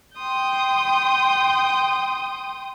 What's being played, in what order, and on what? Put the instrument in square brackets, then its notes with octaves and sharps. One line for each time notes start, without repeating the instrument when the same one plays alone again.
[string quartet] G5 C6 D#6 G6